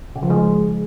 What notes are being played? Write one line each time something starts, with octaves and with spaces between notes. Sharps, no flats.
C#3
F3
G#3